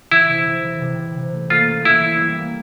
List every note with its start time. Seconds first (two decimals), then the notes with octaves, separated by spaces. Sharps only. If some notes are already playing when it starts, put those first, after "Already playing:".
0.11 E3 E4
0.29 C3
0.47 E3
0.64 E3
0.81 C3
0.99 C3
1.16 C3
1.33 A3
1.50 A#3 F4
1.68 C#4
1.85 E3 E4
2.02 E3
2.20 G3
2.38 A#3